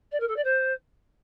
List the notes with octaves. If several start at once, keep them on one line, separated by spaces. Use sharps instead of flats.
D5
A#4
A4
D5
C5